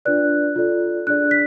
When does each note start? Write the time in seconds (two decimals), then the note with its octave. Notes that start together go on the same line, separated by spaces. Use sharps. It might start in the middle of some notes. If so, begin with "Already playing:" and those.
0.05 D4 F4 B4 D5 F#6
0.56 F4 A4 D5
1.07 D4 G#4 D5 F#6
1.31 B6